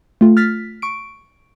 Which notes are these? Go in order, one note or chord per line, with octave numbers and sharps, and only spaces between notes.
A3 F4
F6 A6 B6
C#6 D7